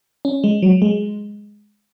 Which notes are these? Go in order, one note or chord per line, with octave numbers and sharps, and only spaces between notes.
C#4
G#3
F#3
G#3